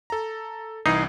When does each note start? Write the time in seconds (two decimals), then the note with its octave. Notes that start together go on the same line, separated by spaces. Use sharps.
0.10 A4 A#5
0.86 C2 E3 D#4 C7